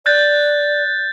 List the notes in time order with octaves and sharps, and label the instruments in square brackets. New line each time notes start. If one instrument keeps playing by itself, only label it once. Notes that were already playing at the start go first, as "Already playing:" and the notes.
[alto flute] D5 [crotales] F#6 G6 A6